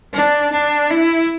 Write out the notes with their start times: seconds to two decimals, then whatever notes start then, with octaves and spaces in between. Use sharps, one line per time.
0.13 D4
0.52 D4
0.91 E4